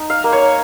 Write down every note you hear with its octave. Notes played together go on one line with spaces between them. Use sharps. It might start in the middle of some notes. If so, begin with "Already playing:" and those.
Already playing: D#4 D#5
F5
A#3
C#5